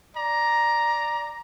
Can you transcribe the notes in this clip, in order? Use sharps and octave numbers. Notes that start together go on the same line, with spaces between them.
D5 A#5